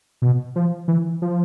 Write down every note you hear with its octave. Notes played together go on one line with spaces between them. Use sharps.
B2
F3
E3
F3